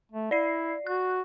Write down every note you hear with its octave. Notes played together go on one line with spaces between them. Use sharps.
A3
E4 D5 C7
F#4 F#6